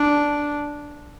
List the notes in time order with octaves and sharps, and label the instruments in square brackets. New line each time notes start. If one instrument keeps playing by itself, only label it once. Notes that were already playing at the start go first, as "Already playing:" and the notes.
Already playing: [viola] D4